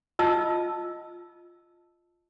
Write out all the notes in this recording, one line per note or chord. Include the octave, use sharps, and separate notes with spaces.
F4 D#5 A5 E6